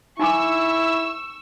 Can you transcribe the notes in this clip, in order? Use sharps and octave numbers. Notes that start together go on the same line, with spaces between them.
D#4 E4 G#5 C#6 D6 E6